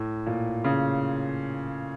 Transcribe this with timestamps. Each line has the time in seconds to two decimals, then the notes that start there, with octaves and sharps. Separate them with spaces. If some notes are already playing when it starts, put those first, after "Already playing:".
Already playing: A2
0.26 A#2
0.64 C#3